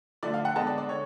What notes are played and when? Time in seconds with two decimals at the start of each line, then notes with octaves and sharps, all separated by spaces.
0.23 D3 F3 A3 D5
0.34 F5
0.45 F#5
0.56 D3 G#3 B3 A5
0.67 D5
0.78 D5
0.89 D3 C#5